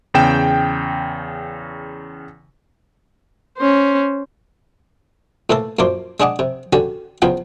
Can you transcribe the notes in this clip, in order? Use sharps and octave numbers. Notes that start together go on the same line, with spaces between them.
E2 C#3 G5 E7
C#4 C5
A2 E3 A#3 A4
F#2 A#2 F3 C5 D6
G#3 D4 G#4 F#5 D6
C3
D3 C#4 F#4 G4
E2 C#3 F3 B3 G5